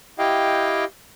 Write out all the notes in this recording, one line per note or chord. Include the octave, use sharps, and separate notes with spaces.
E4 G4 D#5 F5 G5